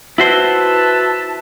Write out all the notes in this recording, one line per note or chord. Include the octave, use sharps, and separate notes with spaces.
E4 F#4 B4 C5 E5 A5